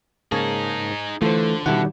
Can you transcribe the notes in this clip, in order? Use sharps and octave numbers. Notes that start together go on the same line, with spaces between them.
G#2 C#3 A#3 C#4 D#4 G#4 A5
D3 E3 A3 F4 A4 C5
B2 D#3 G3 E4 A4 F#5